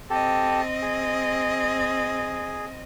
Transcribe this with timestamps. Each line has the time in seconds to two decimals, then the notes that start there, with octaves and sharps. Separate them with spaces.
0.10 C4 G4 A4 D#5
0.82 G#4